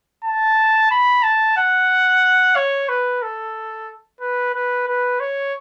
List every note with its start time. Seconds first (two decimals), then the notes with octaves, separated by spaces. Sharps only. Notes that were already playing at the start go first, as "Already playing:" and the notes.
0.24 A5
0.91 B5
1.23 A5
1.57 F#5
2.56 C#5
2.89 B4
3.22 A4
4.21 B4
4.54 B4
4.88 B4
5.20 C#5